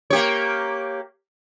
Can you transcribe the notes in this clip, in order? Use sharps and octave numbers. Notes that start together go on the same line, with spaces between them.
A#3 G4 C#5